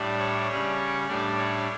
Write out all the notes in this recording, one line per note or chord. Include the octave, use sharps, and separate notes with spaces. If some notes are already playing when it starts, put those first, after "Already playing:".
Already playing: A2 G3 D4
C#5
C#3 G3 C#4
A2 G3 D4 D5
C#5